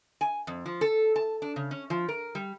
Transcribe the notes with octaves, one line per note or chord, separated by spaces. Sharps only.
G#5
F2
F3
A4
A5
D4
C#3
C#4
F3
A#4
G3